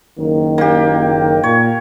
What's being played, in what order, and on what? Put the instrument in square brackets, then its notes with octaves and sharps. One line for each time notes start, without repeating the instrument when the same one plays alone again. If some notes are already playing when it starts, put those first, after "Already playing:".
[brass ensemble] F#1 D#3
[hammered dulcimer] A#3 G4
[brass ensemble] A#2 [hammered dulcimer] C#5